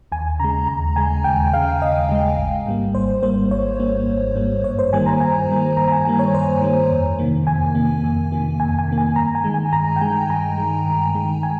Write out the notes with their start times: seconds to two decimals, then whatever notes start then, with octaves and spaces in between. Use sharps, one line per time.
0.12 D#2 G#5
0.40 C#3 A#5
0.44 G#3
0.68 D#2 A#5
0.96 C#3 G#3 G#5
1.24 D#2 G5
1.53 C#3 G#3 F5
1.81 D#2 D#5
2.09 C#3 G#3
2.37 G#1
2.66 G#2 G3 A#3
2.94 G#1 C5
3.23 G#2 G3 A#3 C5
3.51 G#1 C#5
3.79 G#2 G3 A#3
4.08 G#1
4.36 G#2 G3 A#3
4.64 G2 C#5
4.79 C5
4.93 D#3 G3 A#3 G#5
5.06 A#5
5.21 G2 G#5
5.48 D#3 G3 A#3
5.77 G2 A#5
5.88 A#5
5.92 G#5
6.05 D#3 G3 A#3 G#5
6.19 C#5
6.34 G2 C5
6.62 D#3 G3 A#3
6.91 F2
7.18 C3 D#3 A#3
7.47 F2 G#5
7.75 C3 D#3 A#3
8.04 F2
8.32 C3 D#3 A#3
8.60 F2 G#5
8.79 G#5
8.88 C3 D#3 A#3
8.98 G#5
9.16 G2 A#5
9.35 G#5
9.44 D#3 G#3
9.54 G#5
9.73 G2 A#5
9.96 G5
10.01 D#3 G#3 G#5
10.29 G2 A#5
10.57 D#3 G#3
10.86 G2
11.15 D#3 G#3
11.43 G#5